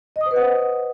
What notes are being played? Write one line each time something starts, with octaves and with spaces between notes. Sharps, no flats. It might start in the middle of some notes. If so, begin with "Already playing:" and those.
D#5
D#6
C5
B4
F#5